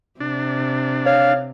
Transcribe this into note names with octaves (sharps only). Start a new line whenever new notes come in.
C3 D4
C#5 F5